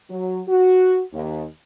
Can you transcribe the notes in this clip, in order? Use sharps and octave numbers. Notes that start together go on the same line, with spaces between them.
F#3
F#4
D#2